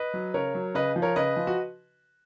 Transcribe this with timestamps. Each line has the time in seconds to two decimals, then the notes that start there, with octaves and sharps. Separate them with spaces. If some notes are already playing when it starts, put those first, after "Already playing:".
Already playing: B4 D#5
0.14 F#3
0.34 C#3 A#4 C#5
0.55 F#3
0.75 C#3 B4 D#5
0.96 F3
1.02 A#4 C#5
1.16 C#3 B4 D#5
1.36 F3
1.47 F#4